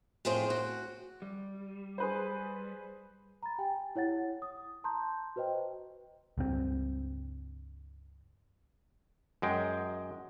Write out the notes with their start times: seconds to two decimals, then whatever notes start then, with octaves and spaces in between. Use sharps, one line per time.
0.25 F2 A2 G#4 C5 G5
0.50 F#4
1.22 G3
1.98 G#4 B4 C5
3.43 A#5 B5 A6
3.58 G4 G5 G#5
3.96 E4 C#5 F#5 A6
4.42 D#6
4.84 A5 A#5 C6 C#6 G6
5.36 F#4 B4 C5 D#5 G5
6.38 C#2 G2 C4
9.42 F#2 G#3 G5